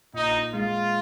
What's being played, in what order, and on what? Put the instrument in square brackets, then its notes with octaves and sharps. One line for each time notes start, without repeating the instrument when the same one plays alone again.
[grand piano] A#2 [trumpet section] D#4
[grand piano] G#3 [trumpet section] F4